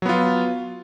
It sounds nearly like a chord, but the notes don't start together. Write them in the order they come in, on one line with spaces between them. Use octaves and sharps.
F#3 B3 F4